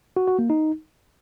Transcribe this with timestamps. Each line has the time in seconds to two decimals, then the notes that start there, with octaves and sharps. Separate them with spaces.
0.17 F#4
0.28 F#4
0.39 A#3
0.50 D#4